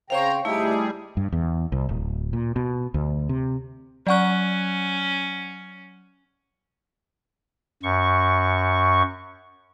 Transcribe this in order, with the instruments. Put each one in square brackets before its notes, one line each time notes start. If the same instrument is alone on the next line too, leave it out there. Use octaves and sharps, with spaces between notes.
[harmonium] C#3 G5 [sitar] C4 C5 C#5 [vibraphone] F5 C#6 [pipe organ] A#5
[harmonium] D2 E5 [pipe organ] G3 G#4 [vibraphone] A3 E4 [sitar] D#4 G4
[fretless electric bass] G2
E2
C2
D1
A#2
B2
D2
C3
[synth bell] F#3 F#5 F#6 [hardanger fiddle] C#4 [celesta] D5 C#6
[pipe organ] F#2 C#6